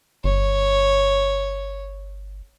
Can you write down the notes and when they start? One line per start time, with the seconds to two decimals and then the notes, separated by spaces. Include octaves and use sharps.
0.24 G1 C#5